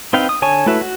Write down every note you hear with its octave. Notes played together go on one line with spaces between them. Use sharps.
C4 D#4 B4 F5 G5
D#6
D3 C#5 G#5 A5 C#6
A3 E4 F#4 B4 E5
F#4